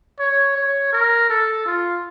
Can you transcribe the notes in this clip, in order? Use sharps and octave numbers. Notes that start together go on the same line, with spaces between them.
C#5
C#5
A#4
A4
F4